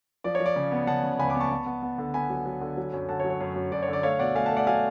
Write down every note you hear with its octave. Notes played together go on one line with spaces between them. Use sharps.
F3 D5
C#5
F3
D5
C#3
B3
C#3 F#5 A5
C#3
C#2 G#5 B5
B5 D6
B3
A5 C#6
B3
B3
B3
D3
B3 G#5 B5
F#3
F#3
D3
F#3
F#2
D3 F#5 A5
C#5
F#3
C#5
F#2
F#2
F#2 D5
C#5
D3
D5
A3 C#5 F5
B2 D5 F#5
A3 F5 G#5
F#5 A5
A3
D5 F#5
F#3 F5 G#5